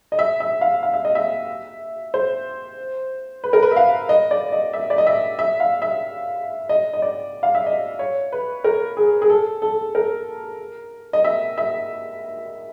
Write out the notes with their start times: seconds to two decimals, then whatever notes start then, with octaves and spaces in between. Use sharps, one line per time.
0.12 D#5
0.19 E5
0.40 E5
0.61 F5
0.83 F5
0.94 E5
1.05 D#5
1.15 E5
2.14 C5
3.44 B4
3.53 A#4
3.63 B4
3.71 E5
3.76 F5
4.09 D#5
4.31 D5
4.52 D#5
4.73 E5
4.90 D5
4.98 D#5
5.07 E5
5.39 E5
5.60 F5
5.82 E5
6.69 D#5
6.93 D#5
7.02 D5
7.43 F5
7.55 E5
7.66 D#5
7.99 C#5
8.32 B4
8.64 A#4
8.97 G#4
9.22 G#4
9.30 A4
9.62 A4
9.95 A#4
11.13 D#5
11.24 E5
11.58 E5